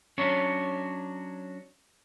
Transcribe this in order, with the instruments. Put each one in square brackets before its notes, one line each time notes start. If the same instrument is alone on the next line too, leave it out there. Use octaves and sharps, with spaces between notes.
[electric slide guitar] F#3 C#4 D4 C#5